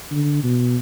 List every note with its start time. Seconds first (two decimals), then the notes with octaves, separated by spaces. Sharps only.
0.11 D3
0.43 B2